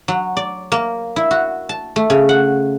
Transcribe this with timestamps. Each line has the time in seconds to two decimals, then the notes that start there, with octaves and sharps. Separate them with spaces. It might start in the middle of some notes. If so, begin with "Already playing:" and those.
0.08 F#3
0.37 D5
0.72 A#3
1.16 E4
1.31 F#4
1.69 A5
1.96 A3
2.10 C#3
2.29 F#5